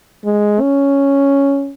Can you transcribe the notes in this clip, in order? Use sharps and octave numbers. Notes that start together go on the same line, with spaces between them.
G#3
C#4